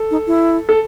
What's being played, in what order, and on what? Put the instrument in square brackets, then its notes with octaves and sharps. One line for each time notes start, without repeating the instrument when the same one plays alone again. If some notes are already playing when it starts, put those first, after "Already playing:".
Already playing: [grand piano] A4
[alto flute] D#4
E4
[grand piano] A4